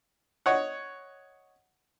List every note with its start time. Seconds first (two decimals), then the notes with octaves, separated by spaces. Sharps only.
0.46 C#5 D#5 F#5